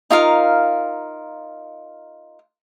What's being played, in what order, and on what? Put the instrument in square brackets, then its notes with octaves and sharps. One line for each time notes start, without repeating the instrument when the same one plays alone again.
[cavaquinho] D#4 F4 A#4 F5